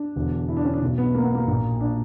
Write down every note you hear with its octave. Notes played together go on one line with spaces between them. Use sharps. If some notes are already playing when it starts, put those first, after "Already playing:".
Already playing: D4
E1 E2 D3
E4
D4
C#4
D4
B1 B2
B3
A#3
B3
A#3
A#1 A#2
D4